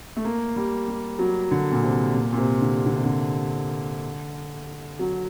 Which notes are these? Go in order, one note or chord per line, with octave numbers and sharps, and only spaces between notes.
A3
A#3
G3
G3
F#3
D3
A#2
C3
A#2
A#2
C3
D3
D3
C3
D3
F#3